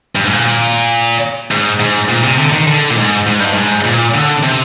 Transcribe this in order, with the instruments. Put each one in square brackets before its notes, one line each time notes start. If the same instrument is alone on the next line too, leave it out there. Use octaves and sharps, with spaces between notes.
[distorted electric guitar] G2
G#2
A#2
G#2
G#2
A#2
C3
D3
D#3
D3
A#2
G#2
G#2
G2
G#2
A#2
D3
C3